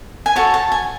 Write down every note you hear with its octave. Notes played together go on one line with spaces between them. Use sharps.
G#5
F#4 A4 C#5 A5
A5
G#5